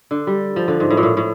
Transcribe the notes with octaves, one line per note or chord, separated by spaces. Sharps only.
D3
G3
F3
D3
G#2
A2
A#2
A2
A2